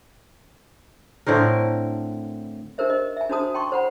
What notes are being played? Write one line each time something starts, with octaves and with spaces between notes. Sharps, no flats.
A2 D3 C4 A#4
D4 D#4 G4 A#4 C5 E5
D#5
E5 G#5
D4 D#4 F#4 C5 A5 D#6
G5 A5 C6 C#6
C5 F#5 B5